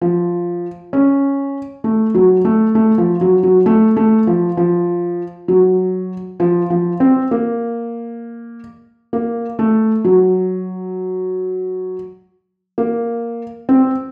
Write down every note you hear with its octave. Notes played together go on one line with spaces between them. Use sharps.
F3
C#4
A3
F#3
A3
A3
F3
F#3
F#3
A3
A3
F3
F3
F#3
F3
F3
C4
A#3
A#3
A3
F#3
A#3
C4